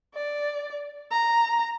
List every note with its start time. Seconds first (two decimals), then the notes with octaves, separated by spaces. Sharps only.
0.14 D5
1.11 A#5